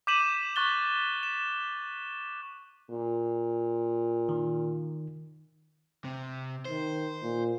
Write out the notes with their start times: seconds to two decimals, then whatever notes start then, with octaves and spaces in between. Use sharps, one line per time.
0.07 D6 G6 B6 D#7 E7 F#7
0.56 C#6 F#6 A6 G7
1.23 E7
2.90 A#2
4.29 D#3
6.04 C3
6.65 D#3 C5
7.23 A#2